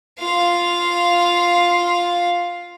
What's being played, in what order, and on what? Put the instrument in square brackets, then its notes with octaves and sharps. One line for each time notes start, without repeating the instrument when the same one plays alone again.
[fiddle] F4 F5